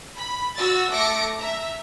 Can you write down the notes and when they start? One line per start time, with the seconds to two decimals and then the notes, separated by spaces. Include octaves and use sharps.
0.17 B5
0.56 F#4 E6 A6
0.91 A3 D6 A#6 C#7 D7
1.39 E5 A#5